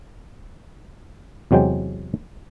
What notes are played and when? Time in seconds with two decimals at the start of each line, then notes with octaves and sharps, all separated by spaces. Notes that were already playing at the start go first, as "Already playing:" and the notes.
1.51 E2 C3 F#3 G#3 G5